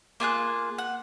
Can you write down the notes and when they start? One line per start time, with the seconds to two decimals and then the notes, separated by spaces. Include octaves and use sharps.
0.20 A#3 F4 G#4 F#6
0.78 F#5